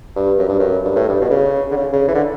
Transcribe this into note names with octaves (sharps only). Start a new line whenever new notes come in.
G2
F#2
G2
F#2
G2
A2
G2
B2
C#3
D3
C#3
C#3
E3
D3